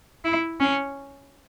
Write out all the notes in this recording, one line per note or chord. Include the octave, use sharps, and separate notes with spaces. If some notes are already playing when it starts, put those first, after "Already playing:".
E4
C#4